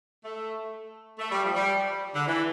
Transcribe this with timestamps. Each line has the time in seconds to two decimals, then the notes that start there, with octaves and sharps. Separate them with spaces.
0.24 A3
1.19 A3
1.31 G3
1.43 F3
1.55 G3
2.14 D3
2.27 E3